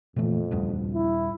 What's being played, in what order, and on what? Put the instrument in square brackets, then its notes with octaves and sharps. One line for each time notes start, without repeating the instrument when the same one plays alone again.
[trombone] F2 [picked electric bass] A#2 E3 A3
[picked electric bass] D#1 G2 B3
[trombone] E4